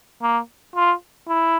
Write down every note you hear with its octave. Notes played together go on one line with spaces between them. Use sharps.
A#3
F4
E4